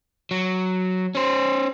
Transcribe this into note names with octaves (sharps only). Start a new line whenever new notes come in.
F#3
C#4 C5